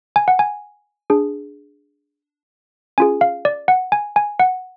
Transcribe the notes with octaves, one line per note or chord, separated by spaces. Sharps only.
G#5
F#5
G#5
D4 G#4
C#4 F4 G#4 G#5
F5
D5
F#5
G#5
G#5
F#5